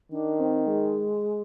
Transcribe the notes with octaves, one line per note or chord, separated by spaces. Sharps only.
D#3 D4
C4
G#3